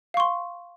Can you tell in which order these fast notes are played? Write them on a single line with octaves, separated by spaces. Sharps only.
F5 C#6 C6